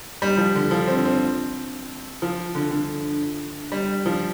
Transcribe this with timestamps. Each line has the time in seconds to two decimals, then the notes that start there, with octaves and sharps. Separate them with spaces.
0.22 G3
0.38 F3
0.55 D3
0.71 F3
0.87 C4
1.05 C4
2.22 F3
2.55 D3
2.71 D3
3.72 G3
4.06 F3